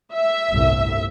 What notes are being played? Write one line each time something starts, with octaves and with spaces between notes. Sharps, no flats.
E5
G1 C2 A2